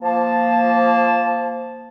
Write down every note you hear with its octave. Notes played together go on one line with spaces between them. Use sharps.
F3 A#3 A5